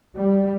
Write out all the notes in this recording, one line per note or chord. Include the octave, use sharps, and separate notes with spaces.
G3